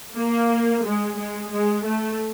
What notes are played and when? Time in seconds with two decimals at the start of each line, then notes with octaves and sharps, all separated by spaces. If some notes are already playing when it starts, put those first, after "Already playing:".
0.16 A#3
0.84 G#3
1.17 G#3
1.51 G#3
1.85 A3